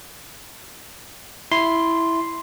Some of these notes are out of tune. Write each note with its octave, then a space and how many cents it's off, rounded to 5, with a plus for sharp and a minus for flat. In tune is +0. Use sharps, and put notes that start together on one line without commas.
E4 +0 C6 +0